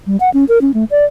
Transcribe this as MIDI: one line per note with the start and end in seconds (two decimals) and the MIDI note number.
0.07 0.17 55
0.20 0.30 78
0.34 0.44 61
0.49 0.59 70
0.61 0.71 61
0.74 0.84 57
0.91 1.05 74